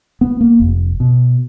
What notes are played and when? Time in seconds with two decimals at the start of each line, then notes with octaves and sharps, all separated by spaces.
0.21 B3
0.41 A#3
0.60 F1
1.00 B2